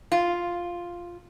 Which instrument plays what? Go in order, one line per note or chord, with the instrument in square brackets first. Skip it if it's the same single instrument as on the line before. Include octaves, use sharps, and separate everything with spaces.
[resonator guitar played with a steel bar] F4